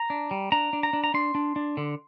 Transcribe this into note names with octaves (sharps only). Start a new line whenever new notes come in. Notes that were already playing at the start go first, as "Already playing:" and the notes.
Already playing: A#5
D4
G3
D4 A#5
D4
A#5
D4
A#5
D4 C6
D4
D4
D3